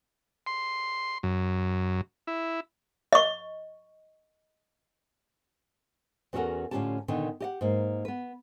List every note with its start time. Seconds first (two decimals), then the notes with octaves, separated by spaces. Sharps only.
0.47 C6
1.23 F#2
2.27 E4
3.13 D#5 C#6
6.33 E2 C#4 F#4 A4 A#4 F#5
6.71 A2 D3 C#4 F4 G4 A5
7.08 A#2 D3 D#3 A#3 B3
7.40 G4 D#5 F#5
7.61 G#2 A#3
8.05 B3 B4